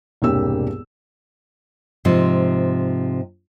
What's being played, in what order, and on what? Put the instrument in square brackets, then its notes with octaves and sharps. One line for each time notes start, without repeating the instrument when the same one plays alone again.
[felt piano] E1 C2 G2 A#3 G4 E6
[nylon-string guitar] G#2 C3 F3